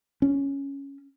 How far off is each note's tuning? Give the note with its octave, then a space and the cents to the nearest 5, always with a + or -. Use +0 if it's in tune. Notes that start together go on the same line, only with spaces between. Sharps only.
C#4 +0